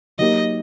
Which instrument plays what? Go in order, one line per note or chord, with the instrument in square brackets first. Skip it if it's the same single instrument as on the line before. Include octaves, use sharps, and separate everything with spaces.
[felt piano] F#3 A#3 D#4 G4 A#4 [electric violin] D#5